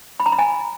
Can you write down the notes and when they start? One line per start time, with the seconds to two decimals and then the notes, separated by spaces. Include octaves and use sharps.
0.20 B5
0.26 A#5
0.32 B5
0.39 G#5